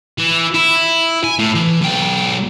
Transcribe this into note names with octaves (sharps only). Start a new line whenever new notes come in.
E3
E4
G#5
A2
E3
B1 G5